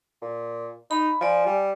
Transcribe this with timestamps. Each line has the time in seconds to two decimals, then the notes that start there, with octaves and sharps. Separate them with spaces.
0.22 A#2
0.91 D#4 B5
1.21 F3 D5 G#5
1.47 G3